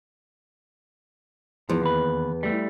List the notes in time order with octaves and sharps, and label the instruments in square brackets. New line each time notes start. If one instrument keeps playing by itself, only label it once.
[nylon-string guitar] E2 [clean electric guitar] F3
[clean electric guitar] D#2 B4
G3 A3